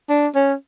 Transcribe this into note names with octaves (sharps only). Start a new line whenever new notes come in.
D4
C#4